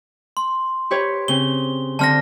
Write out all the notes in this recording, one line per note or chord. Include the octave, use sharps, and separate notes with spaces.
C6
G4 B4 C#5
C#3 C4 G7
D3 C4 A5 F6 A#6